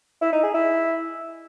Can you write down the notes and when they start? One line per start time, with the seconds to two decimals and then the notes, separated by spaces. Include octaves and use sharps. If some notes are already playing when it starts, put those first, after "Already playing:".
0.22 E4
0.32 D#4
0.43 G#4
0.54 E4